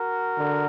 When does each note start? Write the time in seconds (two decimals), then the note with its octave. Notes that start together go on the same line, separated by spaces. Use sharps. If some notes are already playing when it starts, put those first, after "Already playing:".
Already playing: F#4 A#4
0.38 D3